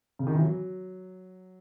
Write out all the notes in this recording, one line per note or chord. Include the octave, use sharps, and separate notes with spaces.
C#3
D#3
E3
F#3